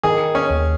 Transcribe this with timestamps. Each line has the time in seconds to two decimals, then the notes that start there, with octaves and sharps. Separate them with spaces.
0.03 D#3 G#4
0.35 C#4
0.50 D#2